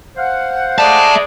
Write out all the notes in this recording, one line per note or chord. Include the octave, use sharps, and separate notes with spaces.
C5 F5 F#5
G#2 G#3 D5 E5 A5